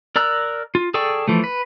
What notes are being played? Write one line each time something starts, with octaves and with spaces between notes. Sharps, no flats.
A#4 D5 A#5 E6 F#6
F4
G#4 A4 D5 G5 C#6
E3 F3 A3
B4